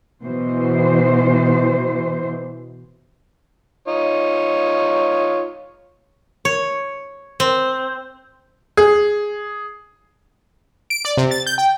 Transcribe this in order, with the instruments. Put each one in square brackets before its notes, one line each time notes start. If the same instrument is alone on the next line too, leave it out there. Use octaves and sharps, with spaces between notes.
[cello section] B2 E3 C5
[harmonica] D#4 F4 C#5
[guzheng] C#5
C4
[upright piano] G#4
[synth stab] D7
D5
C3
A6
G6
G5